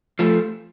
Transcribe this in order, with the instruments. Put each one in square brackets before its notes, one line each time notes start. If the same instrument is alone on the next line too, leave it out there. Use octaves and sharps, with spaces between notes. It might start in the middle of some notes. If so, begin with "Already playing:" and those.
[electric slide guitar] F3 A3